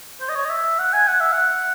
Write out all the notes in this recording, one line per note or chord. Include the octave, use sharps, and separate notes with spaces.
C5
D#5
C#5
D#5
E5
F#5
G#5
F#5
E5
F#5